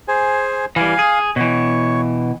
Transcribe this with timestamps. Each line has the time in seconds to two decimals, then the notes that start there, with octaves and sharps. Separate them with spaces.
0.08 G#4 C5 G#5
0.76 E3 G3 F5 G#5
0.99 G#4
1.36 B2 E3 C#5 C#6